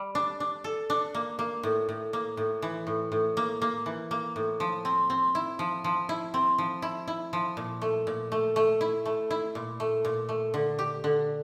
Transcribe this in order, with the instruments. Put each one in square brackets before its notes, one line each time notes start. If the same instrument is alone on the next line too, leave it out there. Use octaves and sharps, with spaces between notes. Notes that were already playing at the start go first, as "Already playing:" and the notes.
Already playing: [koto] G3
D4
D4
A4
D4
A#3
A#3
A2
A2
A#3
A2
E3
A2
A2
A#3
A#3
E3
A#3
A2
F3
C4
C4
E4
F3
F3
E4
C4
F3
E4
E4
F3
A#2
A3
A#2
A3
A3
E4
A3
E4
A#2
A3
A#2
A3
D3
G4
D3